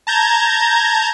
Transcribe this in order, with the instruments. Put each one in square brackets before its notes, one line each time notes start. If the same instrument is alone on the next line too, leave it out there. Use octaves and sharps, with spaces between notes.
[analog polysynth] A5 A#5 G6 G#6